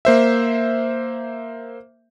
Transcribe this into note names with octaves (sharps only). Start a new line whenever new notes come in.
A#3 C5 E5